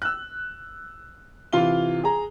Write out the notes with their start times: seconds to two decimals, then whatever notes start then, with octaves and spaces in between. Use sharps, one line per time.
0.02 E6 F#6
1.53 C3 E3 F4 F5 G7
2.03 G#4 A#5